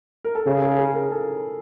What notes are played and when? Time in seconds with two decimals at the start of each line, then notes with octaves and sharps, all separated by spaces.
0.24 A#4
0.35 A4
0.46 C#3 G#4
0.62 G#4
0.78 G#4
0.94 A#4
1.11 A4